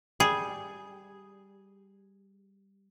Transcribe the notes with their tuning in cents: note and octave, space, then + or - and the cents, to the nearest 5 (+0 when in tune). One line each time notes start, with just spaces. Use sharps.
G3 +0 G#4 +0